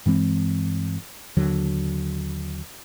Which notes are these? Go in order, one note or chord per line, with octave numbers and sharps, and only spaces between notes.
G2 E3 G#3 C4
D#2 D3 F#3